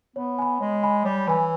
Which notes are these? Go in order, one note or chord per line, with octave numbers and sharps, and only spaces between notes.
B3 C#5
G#5 B5
G#3 C#5
G#5 B5
G3 C#5
E3 G#5 B5